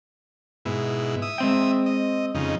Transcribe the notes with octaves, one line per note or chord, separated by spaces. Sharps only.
G#2 B2 E4
E5 D#6
G#3 C4 G5
D#5
F2 C#3 D#4